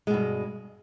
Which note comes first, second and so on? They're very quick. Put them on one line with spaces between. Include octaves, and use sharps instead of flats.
G#3 B2 G2